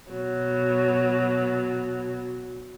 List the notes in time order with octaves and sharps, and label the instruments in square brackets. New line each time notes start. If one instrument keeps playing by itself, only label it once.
[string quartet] B2 F#3